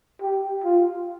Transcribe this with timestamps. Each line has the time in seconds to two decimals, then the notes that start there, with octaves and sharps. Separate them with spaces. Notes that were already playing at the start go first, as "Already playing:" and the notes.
0.22 G4
0.64 F4